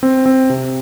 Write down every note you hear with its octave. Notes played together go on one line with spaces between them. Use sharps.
C4
C4
C3